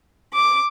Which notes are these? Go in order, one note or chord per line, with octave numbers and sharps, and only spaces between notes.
D6